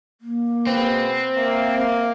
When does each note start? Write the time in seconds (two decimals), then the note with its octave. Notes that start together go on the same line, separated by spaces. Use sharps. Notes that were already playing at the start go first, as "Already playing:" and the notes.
0.21 A#3
0.67 B2 G#3 C4 B4
1.37 A#3 E5